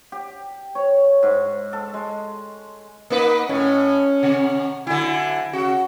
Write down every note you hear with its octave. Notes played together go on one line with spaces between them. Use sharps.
G4
C#5
G#2
A4
G#3
A#3 D#4 B4
A2 C#4
C3
D3 F#3 E4 G#5
C#3 F#4